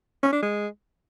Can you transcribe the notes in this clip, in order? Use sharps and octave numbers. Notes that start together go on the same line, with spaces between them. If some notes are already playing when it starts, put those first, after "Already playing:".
C#4
D4
G#3